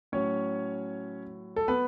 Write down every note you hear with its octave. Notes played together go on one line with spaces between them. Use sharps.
A2 F#3 C#4 C#5
A4
B3 B4